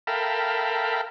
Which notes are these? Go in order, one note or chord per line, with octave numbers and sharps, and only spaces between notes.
A4 A#4 E5 F5 G5 B5